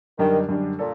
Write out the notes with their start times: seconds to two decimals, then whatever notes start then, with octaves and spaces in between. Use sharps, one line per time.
0.19 F#2 D3 D#3 G3 D4
0.48 F#2 D3 G3 D4
0.79 A#2 A4